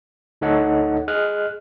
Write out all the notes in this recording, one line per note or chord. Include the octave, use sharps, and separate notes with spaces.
D2 D#4 A4 C#5 D#5 F#5
G#4 D#5 F6 F#6